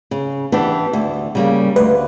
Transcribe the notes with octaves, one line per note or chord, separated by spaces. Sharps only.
C#3
E3 B3 D4 G4
D2
C#3 G3 A#3
D2 B4